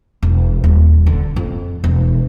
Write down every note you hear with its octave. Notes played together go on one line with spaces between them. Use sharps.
E1
D#1
D3
F2
E1